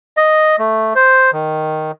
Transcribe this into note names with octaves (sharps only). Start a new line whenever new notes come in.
D#5
A3
C5
D#3